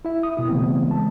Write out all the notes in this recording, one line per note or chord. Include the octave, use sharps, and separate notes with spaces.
E4 E5
D#6
B2 E4
C#3 E3 A3 B3 C4
G#3 A5